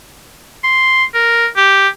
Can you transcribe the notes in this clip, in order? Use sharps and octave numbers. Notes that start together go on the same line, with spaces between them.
C6
A#4
G4